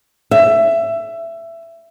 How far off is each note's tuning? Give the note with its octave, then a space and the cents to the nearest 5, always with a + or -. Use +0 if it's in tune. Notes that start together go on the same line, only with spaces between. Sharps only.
E5 +20